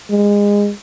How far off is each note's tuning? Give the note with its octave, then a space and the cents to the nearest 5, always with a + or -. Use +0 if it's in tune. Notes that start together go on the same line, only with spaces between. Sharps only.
G#3 -25